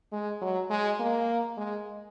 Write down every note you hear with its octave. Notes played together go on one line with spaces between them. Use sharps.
G#3
F#3
G#3
A#3
G#3